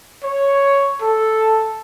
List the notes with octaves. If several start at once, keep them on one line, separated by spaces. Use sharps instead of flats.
C#5
A4